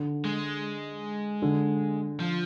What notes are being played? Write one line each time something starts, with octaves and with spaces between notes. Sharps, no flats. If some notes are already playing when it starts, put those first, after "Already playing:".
Already playing: D3
G#3
D3
F3